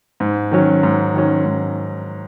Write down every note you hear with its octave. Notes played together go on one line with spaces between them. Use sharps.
G#2
D#3 F#3 C#4
G#2
D#3 F#3 C#4
G#2